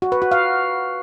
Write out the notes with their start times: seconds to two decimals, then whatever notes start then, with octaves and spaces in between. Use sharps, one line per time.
0.02 F#4
0.12 B4
0.22 F#4
0.31 F5